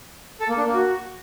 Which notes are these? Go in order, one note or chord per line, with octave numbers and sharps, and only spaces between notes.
A4
A#3
D4
A#3
F#4